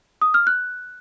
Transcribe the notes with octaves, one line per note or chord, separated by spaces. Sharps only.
D#6
F6
F#6